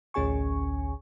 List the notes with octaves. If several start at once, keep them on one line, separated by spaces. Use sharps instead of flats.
A1 D2 C#4 G#4 G#5 C#6